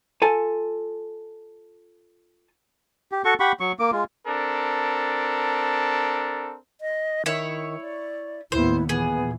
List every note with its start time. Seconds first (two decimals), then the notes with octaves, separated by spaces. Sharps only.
0.22 F4 A4 G#5 A5
3.12 G4
3.25 F#4 A4 C#6
3.40 G4 F#5 B5 C#6
3.60 F#3 C#6
3.79 A#3 D6
3.92 G#3 F4
4.27 C4 D4 A4 A#4
6.81 D#5
7.26 D#3 E4 C#5
7.81 D5
8.52 D#2 A2 B3 E4 C5
8.89 A#2 E3 B3 G#4